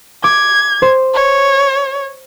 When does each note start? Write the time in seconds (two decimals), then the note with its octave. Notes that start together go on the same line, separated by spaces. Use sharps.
0.24 D6 G#6
0.82 C5
1.15 C#5